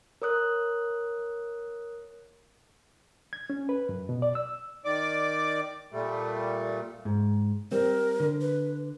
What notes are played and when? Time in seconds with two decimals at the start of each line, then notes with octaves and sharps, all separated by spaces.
0.22 A#4 C#5 D#6 F#6
3.33 G#6
3.50 C#4
3.69 B4
3.89 F#2
4.09 B2
4.22 D5
4.35 E6
4.85 D#3 D5 D6
5.93 A#2 G3 A3
7.05 G#2
7.72 G3 C4 A#4
8.20 D3
8.41 B4